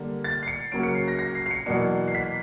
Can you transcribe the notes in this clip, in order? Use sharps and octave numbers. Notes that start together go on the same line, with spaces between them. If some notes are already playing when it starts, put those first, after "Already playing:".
Already playing: D3 G3 A#3
A6
C7
C#7
C#3 F#3 A#3 C#4 D7
C#7
C7
A#6
A#6
C7
C7
C#7
E2 B2 F#3 A#3 D4 C#7
C7
B6